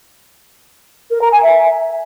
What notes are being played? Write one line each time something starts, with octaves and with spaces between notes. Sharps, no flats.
A#4
A#5
G#5
E5